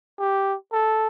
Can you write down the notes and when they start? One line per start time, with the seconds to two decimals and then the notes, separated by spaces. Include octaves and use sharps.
0.19 G4
0.73 A4